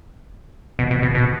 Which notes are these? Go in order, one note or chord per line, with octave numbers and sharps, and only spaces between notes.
B2
B2
B2
B2